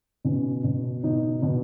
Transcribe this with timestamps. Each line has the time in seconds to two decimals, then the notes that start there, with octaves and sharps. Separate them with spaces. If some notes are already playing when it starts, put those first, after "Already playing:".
0.25 B2 C#4
0.64 B2
1.03 B2 D#4
1.42 B2